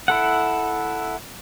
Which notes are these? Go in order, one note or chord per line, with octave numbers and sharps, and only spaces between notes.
E4 A4 F#5